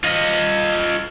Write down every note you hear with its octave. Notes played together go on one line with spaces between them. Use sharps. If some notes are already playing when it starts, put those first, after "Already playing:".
F4 D#5